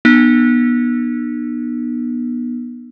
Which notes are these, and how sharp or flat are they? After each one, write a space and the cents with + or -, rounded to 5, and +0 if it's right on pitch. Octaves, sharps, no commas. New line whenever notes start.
B3 -25 D#4 -45